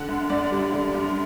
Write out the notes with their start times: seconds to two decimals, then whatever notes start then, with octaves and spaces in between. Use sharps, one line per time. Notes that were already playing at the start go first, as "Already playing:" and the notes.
Already playing: D3 F#5
0.08 F#2
0.30 F#2 D5
0.52 G3
0.72 D3 D5
0.94 F#2